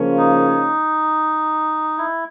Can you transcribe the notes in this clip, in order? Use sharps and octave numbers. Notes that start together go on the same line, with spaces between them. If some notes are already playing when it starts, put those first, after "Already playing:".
Already playing: C#3 F3 A#3 C#4 F4
D#4
E4